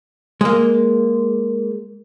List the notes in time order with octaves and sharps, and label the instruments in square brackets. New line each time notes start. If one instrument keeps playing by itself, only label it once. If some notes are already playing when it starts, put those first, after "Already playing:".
[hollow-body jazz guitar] G#3 A#3